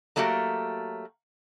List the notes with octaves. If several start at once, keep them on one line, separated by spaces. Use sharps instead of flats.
F#3 A3 A#3 F#4 G4